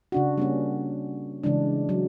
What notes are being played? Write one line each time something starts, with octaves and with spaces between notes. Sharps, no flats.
C#3 D4 F#4
G3 A#3 C#4
C#3 E3 G#3 D4
F#3